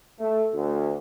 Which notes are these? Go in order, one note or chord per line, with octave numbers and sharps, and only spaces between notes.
A3
D2